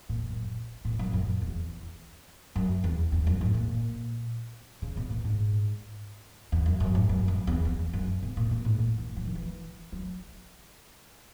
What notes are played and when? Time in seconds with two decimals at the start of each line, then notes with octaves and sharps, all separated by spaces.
0.09 A#2
0.29 F#2
0.85 A#2
0.99 F#2
1.13 F#2
1.41 E2
2.55 F#2
2.84 E2
3.12 E2
3.27 F#2
3.41 G#2
3.54 A#2
4.82 C#3
4.97 B2
5.10 A#2
5.24 G#2
6.52 E2
6.66 F#2
6.80 F#2
6.95 G#2
7.09 F#2
7.28 F#2
7.47 E2
7.65 E2
7.93 F#2
8.22 B2
8.37 A#2
8.51 A#2
8.65 G#2
8.79 A#2
8.98 E3
9.17 F#3
9.27 D#3
9.35 E3
9.92 F#3